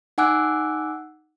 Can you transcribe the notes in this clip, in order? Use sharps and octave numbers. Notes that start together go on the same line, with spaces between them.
D#4 F#5 G#5 D6 E6 F#6